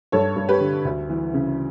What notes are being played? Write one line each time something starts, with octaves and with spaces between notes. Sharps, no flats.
G2 A4 C#5
G2
G4 B4
D3
D2
E3
C#3